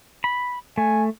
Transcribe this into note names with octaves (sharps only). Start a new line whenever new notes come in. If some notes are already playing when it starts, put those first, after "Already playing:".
B5
A3 G#5